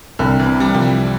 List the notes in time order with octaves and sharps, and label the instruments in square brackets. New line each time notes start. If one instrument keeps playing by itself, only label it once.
[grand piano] C2 [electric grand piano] D3
[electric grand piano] E3
[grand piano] C3
[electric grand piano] G3
[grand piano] C2 [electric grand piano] F3
[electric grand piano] G3